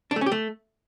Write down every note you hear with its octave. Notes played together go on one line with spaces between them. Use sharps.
D4
A3
C#4
G4
A3